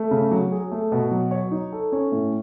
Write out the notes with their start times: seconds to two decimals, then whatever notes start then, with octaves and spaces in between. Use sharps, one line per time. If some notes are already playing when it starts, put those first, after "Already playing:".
Already playing: A3
0.11 C#3
0.31 F#3
0.52 G#4
0.71 A3
0.92 B2
1.11 F#3
1.31 C#5
1.51 D#4
1.72 A4
1.92 C#4
2.12 A2